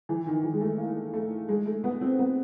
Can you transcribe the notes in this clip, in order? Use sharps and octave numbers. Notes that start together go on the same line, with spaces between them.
E3
D#3
E3
G#3
A3
A#3
A3
G#3
A3
B3
C4
B3